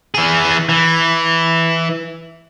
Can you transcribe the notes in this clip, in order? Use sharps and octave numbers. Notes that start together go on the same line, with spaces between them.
E3 G#4
E3